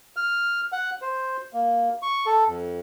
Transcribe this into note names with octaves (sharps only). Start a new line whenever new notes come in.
F6
F#5
C5
A#3
C#6
A4
F2